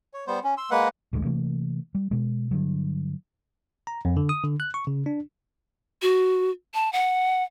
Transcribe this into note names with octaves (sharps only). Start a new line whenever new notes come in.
C#5
G3 B3 C5
C#4
C6 E6
G#3 A#3 B4 F#5
A1 D2 D3 G#3
C3 E3 A3 A#3
G3
B2 G#3
G2 D3 F#3
A#5
F2
D3
D#6
D3
F#6
C#6
C#3
D4
F#4
A5
F#5